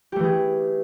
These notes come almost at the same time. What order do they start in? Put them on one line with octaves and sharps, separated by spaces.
G4 A3 E3 G#4